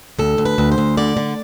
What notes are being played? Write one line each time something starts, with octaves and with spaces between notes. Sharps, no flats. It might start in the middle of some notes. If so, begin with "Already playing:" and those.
D2 A4
D2
B4
D2
C5
D2
D3 D5
D3